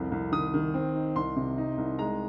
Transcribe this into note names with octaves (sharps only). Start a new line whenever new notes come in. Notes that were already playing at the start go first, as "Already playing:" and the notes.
Already playing: C2 F2
C2
D#3 D#6
D#3
C4
D#4
C2 C6
C3
D#4
C2
G#3 A#5